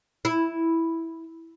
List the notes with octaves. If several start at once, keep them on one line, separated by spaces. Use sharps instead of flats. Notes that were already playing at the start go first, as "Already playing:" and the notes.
E4